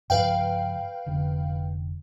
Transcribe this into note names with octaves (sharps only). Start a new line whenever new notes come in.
G2 C#3 F3 B4 F5 G5
F1 D3